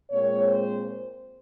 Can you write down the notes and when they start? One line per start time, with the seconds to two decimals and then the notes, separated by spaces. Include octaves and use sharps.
0.11 A#2 G#3 C4 C#5
0.47 C5